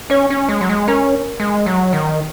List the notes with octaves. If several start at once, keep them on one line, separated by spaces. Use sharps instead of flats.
C#4 C#5
C#4
G#3
F#3
G#3
C#4 A#4
G#3
F#3
D#3